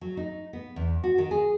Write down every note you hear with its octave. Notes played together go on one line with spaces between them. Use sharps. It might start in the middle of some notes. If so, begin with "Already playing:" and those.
F#3
D#4
B3
E2
F#4
D#3
G#4